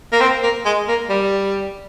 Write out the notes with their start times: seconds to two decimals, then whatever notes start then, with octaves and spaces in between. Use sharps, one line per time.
0.13 A#3
0.21 C4
0.43 A#3
0.65 G#3
0.88 A#3
1.10 G3